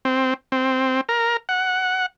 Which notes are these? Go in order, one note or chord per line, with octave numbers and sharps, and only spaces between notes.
C4
C4
A#4
F#5